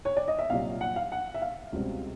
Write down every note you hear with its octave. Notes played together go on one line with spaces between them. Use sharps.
C#5
D5
D#5
E5
C2 A#2 F#3 F5
F#5
F5
F#5
E5
F5
C#2 B2 G3 C4